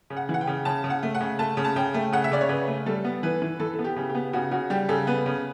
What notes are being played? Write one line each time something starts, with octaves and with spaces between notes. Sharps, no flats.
C#3
F#5
E3
F#5
G5
C#3
C#3 A5
C#3
F#5
A3
F#5
C#3
A3 A5
C#3
A5
C#3 G5
A3
C#3 F#5
E5
C#3 D5
C#5
C#3 B4
A3
G3 A4
B3
E3 B4
E3
E3 A4
B3 A4
G4
C#3
G4
B3
C#3 F#4
C#3 F#4
G3 G4
C#3 A4
B3 B4
C#3